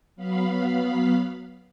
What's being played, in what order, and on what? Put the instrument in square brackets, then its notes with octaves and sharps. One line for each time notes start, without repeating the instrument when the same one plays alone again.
[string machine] F#3 B3 F5 B5